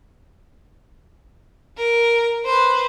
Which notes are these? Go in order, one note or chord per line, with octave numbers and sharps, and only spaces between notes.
A#4
B4 C5